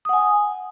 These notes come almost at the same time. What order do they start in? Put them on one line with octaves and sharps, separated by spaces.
D#6 F#5 G#5